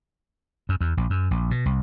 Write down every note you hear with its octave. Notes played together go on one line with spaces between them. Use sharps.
F#2
E2
A#1
F#2
A#1
B2
C2